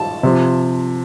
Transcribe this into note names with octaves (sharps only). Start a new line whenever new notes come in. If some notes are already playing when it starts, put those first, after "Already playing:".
Already playing: A5
C3 F3